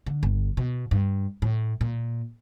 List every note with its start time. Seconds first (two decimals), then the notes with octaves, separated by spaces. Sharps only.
0.06 D3
0.23 G1
0.57 B2
0.91 G2
1.42 A2
1.81 A#2